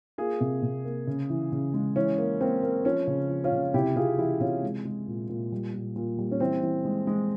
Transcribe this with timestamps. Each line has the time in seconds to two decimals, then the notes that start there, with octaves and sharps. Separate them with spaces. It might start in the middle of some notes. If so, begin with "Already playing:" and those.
0.18 A#3 F4 G#4
0.41 C3
0.63 C3
0.85 A#3
1.07 C#3
1.30 E3
1.52 C#3
1.74 G#3
1.96 E3 C#4
2.18 A#3
2.40 A#3 C4
2.63 A#3
2.85 F3 C#4
3.07 C#3
3.29 F3
3.44 C#4 F4
3.52 C#3
3.74 C3 E4 G4
3.96 C3 F4 G#4
4.18 E3 E4 G4
4.40 C3 C#4 F4
4.63 G#3
4.85 G#3
5.07 A#2
5.30 A#2
5.52 G3
5.74 A#2
5.96 A#2
6.18 G3
6.31 C#4
6.40 E3 C4
6.63 E3
6.85 G#3
7.07 G#3